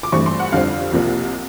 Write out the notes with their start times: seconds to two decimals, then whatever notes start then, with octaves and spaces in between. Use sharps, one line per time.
0.03 D6
0.12 G2 E3 A3 C4 C#6
0.26 C6
0.39 F#5
0.52 F2 D3 G3 C4 F5
0.92 C2 C3 F3 A#3